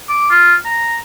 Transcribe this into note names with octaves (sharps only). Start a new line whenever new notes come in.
D6
F4
A#5